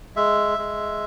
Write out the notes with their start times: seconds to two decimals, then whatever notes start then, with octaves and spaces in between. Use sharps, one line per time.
0.16 G#3 E5
0.58 G#3